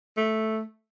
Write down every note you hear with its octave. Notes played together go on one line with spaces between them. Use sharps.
A3